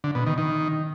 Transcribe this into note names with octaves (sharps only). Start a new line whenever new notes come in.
D3
B2
D#3
D#3